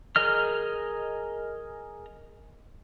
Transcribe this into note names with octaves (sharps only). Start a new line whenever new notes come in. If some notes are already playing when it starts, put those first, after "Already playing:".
G#4 A#4 D#5 F6